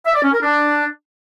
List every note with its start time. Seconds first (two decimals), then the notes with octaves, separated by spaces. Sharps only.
0.06 E5
0.15 D5
0.24 C#4
0.33 A#4
0.42 D4